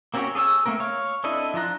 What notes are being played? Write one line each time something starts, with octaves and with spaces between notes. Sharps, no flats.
A#3 C4 C#4 F#4 G4
G#4 A4 C#5 F5 E6
A3 A#3 C4 A#4
C#5 F5
C4 D4 E4 A4 D#5
F3 D4 F4 A#5 F#6